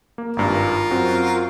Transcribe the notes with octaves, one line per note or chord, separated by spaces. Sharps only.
A#3
G#1 G2 F4 A#4
F#2 C4 F#4